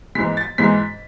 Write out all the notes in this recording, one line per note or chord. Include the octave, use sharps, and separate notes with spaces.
G#2 E3 G#3 B6
A6
G#2 E3 G#3 B6